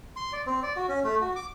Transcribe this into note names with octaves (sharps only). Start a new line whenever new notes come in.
C6
D5
C4
D5
F#4
C#4
A3
F#4
D6